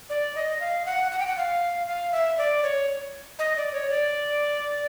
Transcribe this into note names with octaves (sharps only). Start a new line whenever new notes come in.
D5
D#5
F5
F#5
F#5
G5
F#5
F5
F5
E5
D5
C#5
D#5
D5
C#5
D5